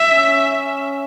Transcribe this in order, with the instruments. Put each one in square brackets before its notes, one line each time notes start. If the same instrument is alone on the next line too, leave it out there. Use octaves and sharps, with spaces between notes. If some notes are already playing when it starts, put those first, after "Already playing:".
Already playing: [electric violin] E5
[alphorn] C#4